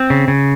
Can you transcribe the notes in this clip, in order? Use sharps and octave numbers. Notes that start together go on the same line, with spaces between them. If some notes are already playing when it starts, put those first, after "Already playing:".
Already playing: C4
C#3
C#3